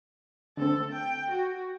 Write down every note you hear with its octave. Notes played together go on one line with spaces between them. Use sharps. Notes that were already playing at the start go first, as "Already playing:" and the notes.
D3 A3 C4 A4
G5
F#4